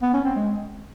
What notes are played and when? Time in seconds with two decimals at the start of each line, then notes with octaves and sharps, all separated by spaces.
0.02 B3
0.14 C#4
0.25 C4
0.36 G#3